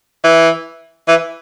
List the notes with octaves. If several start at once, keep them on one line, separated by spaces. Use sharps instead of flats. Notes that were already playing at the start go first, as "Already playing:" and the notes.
E3
E3